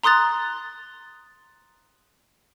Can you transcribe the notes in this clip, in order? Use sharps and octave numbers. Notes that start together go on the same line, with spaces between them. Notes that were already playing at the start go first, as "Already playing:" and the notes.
A#5 C6 D#6 F#6 A6